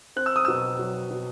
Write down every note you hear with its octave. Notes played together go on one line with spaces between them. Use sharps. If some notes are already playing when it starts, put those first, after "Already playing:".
C4 F#6
E6
D#6
B2 E6
F#3
B2